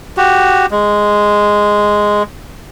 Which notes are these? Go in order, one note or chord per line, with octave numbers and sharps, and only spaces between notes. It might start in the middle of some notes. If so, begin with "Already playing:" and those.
F#4 G4
G#3